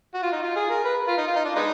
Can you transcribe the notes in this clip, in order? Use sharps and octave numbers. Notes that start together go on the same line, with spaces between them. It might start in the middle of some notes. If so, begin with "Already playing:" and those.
F#4
F4
D#4
F4
G#4
A#4
B4
F4
D#4
F4
D#4
D4
G#3 B3 D#4